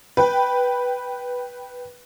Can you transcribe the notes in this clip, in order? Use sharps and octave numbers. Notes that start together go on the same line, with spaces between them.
B4 G5